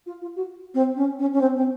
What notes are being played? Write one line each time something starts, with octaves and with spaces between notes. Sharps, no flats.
F4
F4
F#4
C4
C#4
C#4
C#4
C4
C4